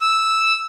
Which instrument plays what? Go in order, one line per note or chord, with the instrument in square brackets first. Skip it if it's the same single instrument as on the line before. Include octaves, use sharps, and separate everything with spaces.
[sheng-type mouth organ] E6